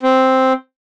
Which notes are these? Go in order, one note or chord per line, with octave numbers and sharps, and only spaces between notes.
C4